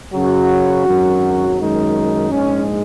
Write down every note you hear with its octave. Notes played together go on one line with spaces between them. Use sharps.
F#2 C#3 F#3 F#4
G#1 F#2 F#3
F#2 D#3 G#3 D#4
A#1 G#2 G#3 C#4